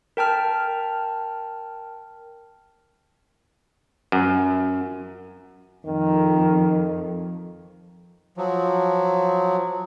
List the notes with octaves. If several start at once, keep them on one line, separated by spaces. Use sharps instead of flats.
A#4 G5 A5 F6
F#2
F2 D#3
F3 F#3